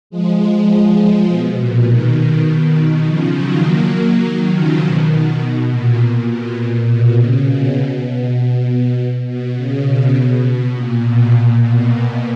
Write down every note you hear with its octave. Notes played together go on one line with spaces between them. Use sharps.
F3 G#3
F3 G#3
B2
A#2
B2 D#3
B2 D#3
C#3 F3
D#3 F#3
F#3 A#3
F#3 A#3
D#3 F#3
C#3 F3
B2 D#3
B2 D#3
B2
A#2
A#2
B2
A#2
B2
C#3
B2
B2
B2
B2
C#3
B2
A#2
B2
A#2
B2